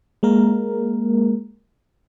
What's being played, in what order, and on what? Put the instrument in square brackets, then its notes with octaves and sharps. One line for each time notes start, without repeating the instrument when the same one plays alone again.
[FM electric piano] G#3 A#3 A#4